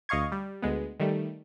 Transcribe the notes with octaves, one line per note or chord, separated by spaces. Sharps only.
D2 D#5 F5 C#6 G#6
G3
D2 G#3 B3
D#3 G3 A3